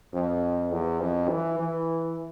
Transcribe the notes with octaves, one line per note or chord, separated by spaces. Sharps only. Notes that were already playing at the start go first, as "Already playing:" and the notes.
F2
E2
F2
E3
E3